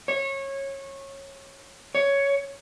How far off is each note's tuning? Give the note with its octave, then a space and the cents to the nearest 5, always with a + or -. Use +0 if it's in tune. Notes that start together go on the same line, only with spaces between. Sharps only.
C#5 -20
C#5 +10